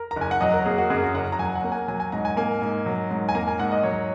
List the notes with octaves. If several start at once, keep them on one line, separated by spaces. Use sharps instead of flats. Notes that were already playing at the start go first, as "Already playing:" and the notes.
Already playing: A#4
A#5
F#1 G#5
F#5
F#3 D#5
A#4
A#3 G#4
F#4
F#2 G#4
F#4
F#1 F#5
A#5
F#3 G#5
F#5
A#3
G#5
F#3 G#5
G#5
G#2 A#5
G#5
A#3 G#5
G#2
F#3
G#2
G#5
A#3 A#5
G#5
G#2 F#5
D#5
F#3 C#5